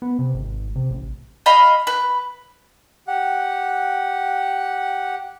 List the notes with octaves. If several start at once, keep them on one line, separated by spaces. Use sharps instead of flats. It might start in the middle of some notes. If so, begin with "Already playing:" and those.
B3
C3
G#1
C3
A1
D#5 F5 B5
B4
G4 F#5